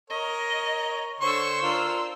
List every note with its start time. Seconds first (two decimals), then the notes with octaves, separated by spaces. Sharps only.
0.10 A#4 C#5 D#5
1.21 D3 C5 C#5 C#6 E6
1.62 D4 F4 A#4